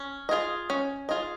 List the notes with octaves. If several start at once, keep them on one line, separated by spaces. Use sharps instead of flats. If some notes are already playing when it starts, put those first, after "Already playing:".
Already playing: C#4
F4 G#4 D#5
C#4
F4 G#4 D#5